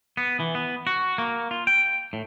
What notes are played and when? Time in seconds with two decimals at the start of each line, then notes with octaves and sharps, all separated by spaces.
0.17 B3
0.40 E3
0.55 B3
0.87 F#4
1.18 A#3
1.51 F4
1.67 G5
2.13 A2